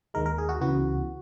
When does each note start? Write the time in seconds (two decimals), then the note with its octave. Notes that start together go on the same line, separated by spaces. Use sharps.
0.14 D#2 D#3 G#3 A#4
0.26 A#4
0.38 G#4
0.49 F#4
0.60 C#2 C#3 E3 B3 F#4